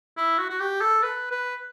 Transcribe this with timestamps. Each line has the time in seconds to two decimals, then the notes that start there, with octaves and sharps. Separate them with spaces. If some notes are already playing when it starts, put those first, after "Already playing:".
0.17 E4
0.38 F#4
0.50 F#4
0.60 G4
0.80 A4
1.02 B4
1.31 B4